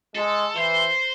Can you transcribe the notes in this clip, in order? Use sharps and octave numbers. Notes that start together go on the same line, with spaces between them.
G#3 A4
E3 C5